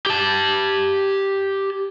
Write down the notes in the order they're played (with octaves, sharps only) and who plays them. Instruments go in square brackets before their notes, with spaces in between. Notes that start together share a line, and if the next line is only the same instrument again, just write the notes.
[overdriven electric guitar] G4 A5